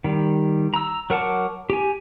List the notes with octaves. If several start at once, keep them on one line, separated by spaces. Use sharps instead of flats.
D#3 G3
A#5 E6
F#3 A#4 F#5 A5 D6
G4 G#5